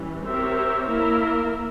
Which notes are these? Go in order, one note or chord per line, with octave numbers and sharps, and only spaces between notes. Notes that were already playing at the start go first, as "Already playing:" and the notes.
Already playing: E3 G3 C#4
C4 G4 A#4 C#5 E5
A#3 E4 A#4 E5